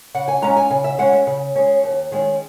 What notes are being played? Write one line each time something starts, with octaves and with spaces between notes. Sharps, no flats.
C#3 F#5
G#5
G#3 C#4 A#5
G#5
C#3 G#5
E5
G#3 C#4 F#5
E5
C#3
G#3 C#4
D#2
D#3 G#3 C#4